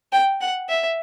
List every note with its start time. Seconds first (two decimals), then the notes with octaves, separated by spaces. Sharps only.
0.12 G5
0.41 F#5
0.69 E5